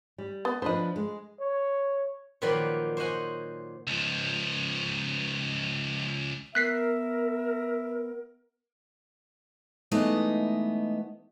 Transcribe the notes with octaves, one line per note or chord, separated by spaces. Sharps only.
G3
B3
F3 D4 B4 C5 D#5
G#3
C#5
A#2 D#3 F3 F#3 B4 D5
C5 C#5 D#5 F#5 G#5
C#2 F3
B3 A#4 E5 F#6 B6 C7
E3 G#3 A3 B3 D#4 D#5